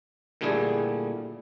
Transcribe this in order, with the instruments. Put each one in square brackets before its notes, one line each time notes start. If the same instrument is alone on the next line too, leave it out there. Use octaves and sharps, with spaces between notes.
[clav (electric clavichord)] A#2 D3 G3 A3 E4 G#4